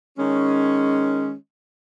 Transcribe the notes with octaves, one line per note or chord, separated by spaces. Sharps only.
D#3 G#3 C#4